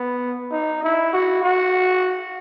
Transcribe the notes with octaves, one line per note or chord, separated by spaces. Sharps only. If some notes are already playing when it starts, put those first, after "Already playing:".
Already playing: B3
D#4
E4
F#4
F#4